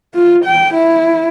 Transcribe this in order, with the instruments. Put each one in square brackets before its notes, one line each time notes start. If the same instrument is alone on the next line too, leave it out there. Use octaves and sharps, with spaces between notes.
[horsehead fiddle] F4
G5
E4